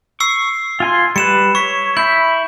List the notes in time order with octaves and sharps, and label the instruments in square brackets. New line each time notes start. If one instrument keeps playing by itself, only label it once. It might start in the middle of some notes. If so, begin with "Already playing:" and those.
[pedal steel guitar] C#6 [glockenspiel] E6 C7
[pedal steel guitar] F4 G#5 C6
[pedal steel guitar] G3 B4 [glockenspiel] C#7 E7
[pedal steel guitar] C#5 [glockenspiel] C#6 B6
[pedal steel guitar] E4 B5 [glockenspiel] G6